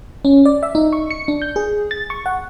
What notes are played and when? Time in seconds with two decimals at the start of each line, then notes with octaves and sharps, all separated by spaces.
0.25 C#4
0.46 D5
0.63 E5
0.75 D#4
0.93 C#6
1.11 C#7
1.28 D4
1.42 G6
1.56 G#4
1.91 A6
2.10 C#6
2.26 F#5